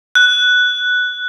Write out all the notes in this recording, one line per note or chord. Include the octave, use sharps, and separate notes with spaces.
F#6